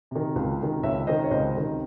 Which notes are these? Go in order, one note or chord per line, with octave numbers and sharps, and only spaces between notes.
C3 D#3
C#2
C3 D#3
C#2 C#5 E5
C3 D#3 C5 D#5
C#5
C#2 C5 D#5
C3 D#3